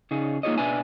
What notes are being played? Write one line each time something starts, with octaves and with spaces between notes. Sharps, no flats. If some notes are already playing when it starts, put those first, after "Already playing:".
C#3 D#4 G#4
A#3 D#4 F4 G#4 C#5 D#5
B2 D4 B4 E5 G#5